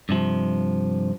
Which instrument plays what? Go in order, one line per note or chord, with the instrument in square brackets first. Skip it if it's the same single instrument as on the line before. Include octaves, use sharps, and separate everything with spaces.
[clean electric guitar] G2 C3 F3